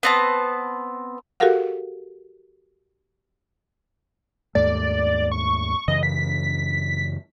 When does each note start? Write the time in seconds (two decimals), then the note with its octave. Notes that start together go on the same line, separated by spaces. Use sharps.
0.03 B3 C4 A5
1.40 F#4 G4 A4 A#4 F5 F#5
4.55 D#2 G#2 A3 D5
5.31 C#6
5.88 F#2 C#3 E3 D#5
6.03 B6